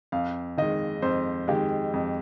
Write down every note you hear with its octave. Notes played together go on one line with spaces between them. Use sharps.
F2 F5
D#3 G#3 D#5
F2 C5
D#3 G#3 G4
F2